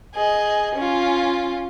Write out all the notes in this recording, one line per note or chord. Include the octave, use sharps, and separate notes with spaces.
G#4 D#5
C#4 F4